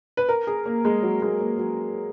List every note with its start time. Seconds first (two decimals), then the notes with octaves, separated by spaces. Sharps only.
0.17 B4
0.29 A#4
0.47 G#4
0.66 A#3
0.85 G#3
1.03 F#3
1.22 G#3
1.41 A#3
1.58 F#3